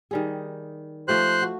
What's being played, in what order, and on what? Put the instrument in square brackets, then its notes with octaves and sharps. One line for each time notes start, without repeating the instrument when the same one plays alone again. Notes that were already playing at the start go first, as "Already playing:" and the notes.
[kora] D#3 G3 G#4
[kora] F3 A3 G4 [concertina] C5 F#6
[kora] F#4